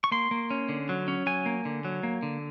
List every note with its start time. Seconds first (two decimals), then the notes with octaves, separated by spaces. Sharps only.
0.04 C#6
0.11 A#3 C6
0.31 A#3
0.50 C#4
0.69 D3
0.89 F#3
1.08 C#4
1.26 F#3 G#5
1.46 A#3
1.65 D3
1.85 F#3
2.03 A#3
2.23 D3